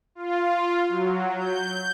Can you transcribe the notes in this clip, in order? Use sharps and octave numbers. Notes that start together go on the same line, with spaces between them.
F4
F#3
G6